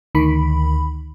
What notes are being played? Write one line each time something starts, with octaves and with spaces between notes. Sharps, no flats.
D2 D#3 B5